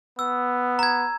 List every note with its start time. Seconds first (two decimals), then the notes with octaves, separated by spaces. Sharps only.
0.19 B3 E6
0.79 A#5 G#6